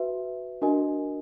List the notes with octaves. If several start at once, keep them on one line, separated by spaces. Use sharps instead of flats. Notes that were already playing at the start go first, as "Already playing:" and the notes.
Already playing: F#4 B4 E5
D4 F#4 A#4 D#5 G#5